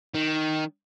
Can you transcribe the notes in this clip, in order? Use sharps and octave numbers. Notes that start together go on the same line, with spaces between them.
D#3